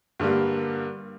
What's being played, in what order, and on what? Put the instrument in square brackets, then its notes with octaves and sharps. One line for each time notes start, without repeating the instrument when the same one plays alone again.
[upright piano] G2 D3 G3 A#3